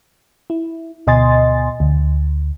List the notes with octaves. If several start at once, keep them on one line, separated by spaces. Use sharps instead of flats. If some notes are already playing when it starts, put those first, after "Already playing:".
E4
D2 B2 D#5 G#5 C6 A6
D2